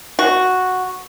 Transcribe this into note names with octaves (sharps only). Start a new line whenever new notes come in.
F#4